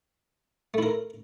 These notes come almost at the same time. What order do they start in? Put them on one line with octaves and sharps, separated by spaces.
A3 E4 A#4